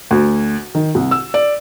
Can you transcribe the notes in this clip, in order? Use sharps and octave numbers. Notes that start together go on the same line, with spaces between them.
D2
D#3
C2
E6
D5